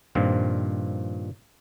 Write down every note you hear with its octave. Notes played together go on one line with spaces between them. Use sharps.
G2 A#2 D#3 F3 C4